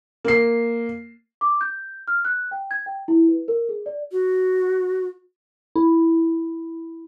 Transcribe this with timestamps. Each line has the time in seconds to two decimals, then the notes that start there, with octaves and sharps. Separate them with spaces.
0.25 A#3 C7
1.41 D6
1.61 G6
2.08 F6
2.25 F#6
2.51 G5
2.71 G#6
2.86 G5
3.08 E4
3.28 B4
3.48 A#4
3.69 G#4
3.86 D5
4.12 F#4
5.76 E4